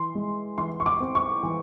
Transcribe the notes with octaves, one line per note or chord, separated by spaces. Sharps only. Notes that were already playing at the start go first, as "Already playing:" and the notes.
Already playing: E3 C6
G#3
E3 C6
C#6
D6
C4
C#6
E3